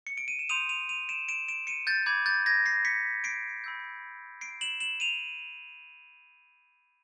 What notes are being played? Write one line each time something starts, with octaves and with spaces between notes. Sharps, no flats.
C#7
D7
D#7
E7
C6 D#6 G6 D#7 F7
D#7 F7
D#7 F7
D7 E7
D7 E7
D7 E7
C#7 D#7
G6 A6
B5 D6 G6 G#6
G6 A6
G#6 A#6
A#6 C7
B6 C#7
C7 D7
B5 E6 G6
C7 D7
E7 F#7
E7 F#7
D#7 F7